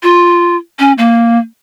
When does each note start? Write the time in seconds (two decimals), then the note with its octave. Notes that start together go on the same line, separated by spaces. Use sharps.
0.03 F4
0.79 C#4
0.98 A#3